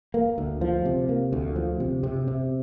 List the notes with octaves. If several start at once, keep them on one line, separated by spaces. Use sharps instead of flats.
A#3
D2
F3
C3
A#3
D2
F3
C3
C3
C3